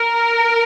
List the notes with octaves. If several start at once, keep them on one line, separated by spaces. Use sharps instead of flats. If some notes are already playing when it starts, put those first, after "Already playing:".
Already playing: A#4